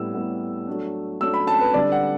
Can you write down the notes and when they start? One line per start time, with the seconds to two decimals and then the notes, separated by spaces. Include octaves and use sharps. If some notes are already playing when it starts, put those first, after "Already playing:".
Already playing: A2 G3 B3 E6
0.13 A2 G3 B3
0.67 F#3 A3 D4
1.20 F#3 A3 D4 E6
1.34 B5
1.47 A5
1.61 B4
1.74 D3 G3 D4 D5
1.92 F#5